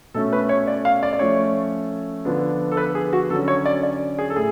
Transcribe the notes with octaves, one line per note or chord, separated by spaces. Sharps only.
B2 A3 C#4 A4
B4
C#5
D5
F5
D5
D5
F3 A3 C#4 C#5
D3 F3 B3 D4
A4
B4
G#4
F#4
D3 F#3 C#4 A4
C#5
D5
D5
G#4
A4
A2 G#4